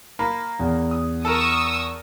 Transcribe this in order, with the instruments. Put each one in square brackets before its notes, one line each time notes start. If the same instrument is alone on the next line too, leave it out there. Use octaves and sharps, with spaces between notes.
[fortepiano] A#3 [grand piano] B5
[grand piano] E2
[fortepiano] D#6
[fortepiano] A4 A#4 [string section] C#6 D#6 E6